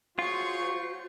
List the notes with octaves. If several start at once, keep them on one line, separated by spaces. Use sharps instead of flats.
F4 F#4 G#4 C5 C#5 C#6